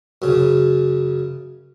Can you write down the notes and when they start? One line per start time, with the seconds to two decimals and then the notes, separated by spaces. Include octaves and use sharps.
0.22 F#2 C#3